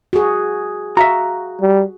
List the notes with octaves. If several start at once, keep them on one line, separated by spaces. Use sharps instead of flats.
F#4 G#4
F#4 E5 F5 A#5
G3